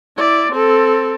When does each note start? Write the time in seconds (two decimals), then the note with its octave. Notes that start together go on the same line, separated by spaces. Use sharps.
0.17 E4 D5
0.52 C4 A4